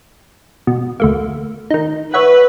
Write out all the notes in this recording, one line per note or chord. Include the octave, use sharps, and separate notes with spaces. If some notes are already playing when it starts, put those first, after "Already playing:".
B2
D2 A3 A#3
D#3 D#4
B4 C#5 E5 F#5